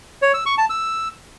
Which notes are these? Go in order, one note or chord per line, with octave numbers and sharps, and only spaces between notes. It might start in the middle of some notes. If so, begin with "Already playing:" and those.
C#5
E6
C#6
A5
E6